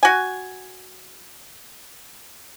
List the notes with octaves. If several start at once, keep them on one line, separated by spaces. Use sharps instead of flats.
F#4 G#5